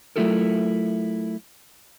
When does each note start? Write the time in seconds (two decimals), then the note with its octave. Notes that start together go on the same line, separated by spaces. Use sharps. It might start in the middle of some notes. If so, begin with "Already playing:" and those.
0.16 F#3 A3 E4 F4 A4 A#4